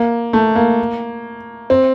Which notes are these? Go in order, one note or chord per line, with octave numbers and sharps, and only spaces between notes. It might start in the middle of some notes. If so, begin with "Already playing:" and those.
Already playing: A#3
A3
A#3
C4